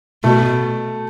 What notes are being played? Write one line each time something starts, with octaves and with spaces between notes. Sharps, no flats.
B2 A3